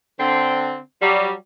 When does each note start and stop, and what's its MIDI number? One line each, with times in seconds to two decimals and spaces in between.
0.19 0.78 50
0.19 0.78 60
1.01 1.32 54
1.01 1.32 55